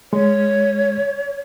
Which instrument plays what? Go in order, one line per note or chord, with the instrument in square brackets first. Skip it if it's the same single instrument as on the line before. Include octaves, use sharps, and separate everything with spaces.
[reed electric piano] G#3 [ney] C#5